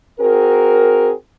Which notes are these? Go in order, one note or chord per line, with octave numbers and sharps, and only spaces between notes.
C4 F#4 G#4 A#4